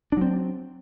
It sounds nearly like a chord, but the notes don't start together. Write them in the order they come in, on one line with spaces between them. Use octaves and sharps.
D4 F#3 C4